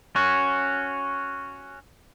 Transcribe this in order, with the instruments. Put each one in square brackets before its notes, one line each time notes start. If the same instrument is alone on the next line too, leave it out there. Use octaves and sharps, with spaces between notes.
[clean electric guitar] C#4 F#4